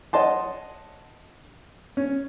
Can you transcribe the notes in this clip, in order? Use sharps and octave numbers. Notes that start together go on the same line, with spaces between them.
C#5 D#5 F#5 A5 C6
C#4